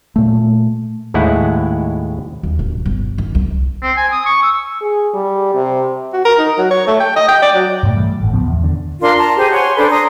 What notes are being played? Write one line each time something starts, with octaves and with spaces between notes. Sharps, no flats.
A#2 A3
D#2 A2 G#3 E4 F#5
D#2
D1
G1
D#3
C2
C4
G#5
D#6
C#6
E6
G#4
G3
C3
F#4
A#4
D#4
F#3
C#5
A3
G5
D#5
G5
D5
F#3
G2 A#2 A3
E3 G3 A3
G1 A2
C#2 F3 B3
E2
D3
D4 F4 A#4 C6
A5 A#5
G4 G#4 C5
C#5 F#5 G#5 C6
D4 A4 B4 C5
A#5 C6 D#6